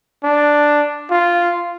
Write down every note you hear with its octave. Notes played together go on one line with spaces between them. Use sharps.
D4
F4